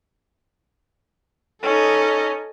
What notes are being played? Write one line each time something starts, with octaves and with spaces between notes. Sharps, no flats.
C#4 D#4 A4 D#5